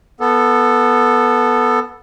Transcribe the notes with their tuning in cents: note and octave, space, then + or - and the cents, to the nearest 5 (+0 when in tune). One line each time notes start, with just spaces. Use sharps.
B3 -10 A4 +0